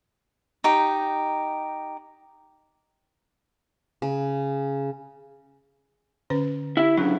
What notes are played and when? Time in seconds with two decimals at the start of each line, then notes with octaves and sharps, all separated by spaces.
0.64 D#4 G4
4.02 C#3
6.30 D3 C#4 B4
6.77 E4 G4 E5
6.97 C#2 F#3 C#4 D4